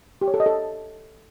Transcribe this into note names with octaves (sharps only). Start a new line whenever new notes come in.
G4
C#5
A4
D#5
A4